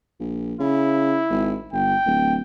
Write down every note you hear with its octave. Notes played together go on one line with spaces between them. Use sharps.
A#1
C#3 E4
G#1
G1 G5
D1